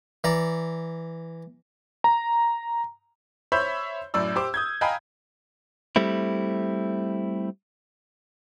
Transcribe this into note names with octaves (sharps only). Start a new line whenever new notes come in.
E3 D5 A#5
A#5
C5 C#5 E5 B5 G6
F#2 A2 D5 E6
G4 C5 D6
D#6 G6 G#6
D#5 F5 G5 G#5 A#5 B5
G3 A3 C4 E4